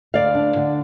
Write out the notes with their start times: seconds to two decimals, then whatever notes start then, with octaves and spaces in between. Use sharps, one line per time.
0.14 D2 D5 F5
0.35 D4
0.56 D3